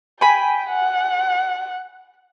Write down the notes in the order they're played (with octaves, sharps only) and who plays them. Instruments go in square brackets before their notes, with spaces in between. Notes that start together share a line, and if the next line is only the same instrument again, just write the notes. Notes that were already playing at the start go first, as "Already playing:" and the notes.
[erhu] G5 [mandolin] G#5 B5
[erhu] F#5